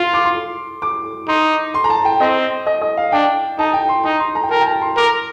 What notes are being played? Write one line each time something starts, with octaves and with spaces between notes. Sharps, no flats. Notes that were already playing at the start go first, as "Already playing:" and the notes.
Already playing: F4 C6
D6
C6
D6
D#4 C6
C6
A#5
A5
G5
C4 D#5
D#5
D#5
F5
D4 G5
D#4 A5
G5
C6
D#4 A#5
C6
A#5
G5
A#4 A5
G5
A5
C6
A#4 D6